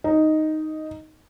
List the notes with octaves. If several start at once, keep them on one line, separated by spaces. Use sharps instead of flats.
D#4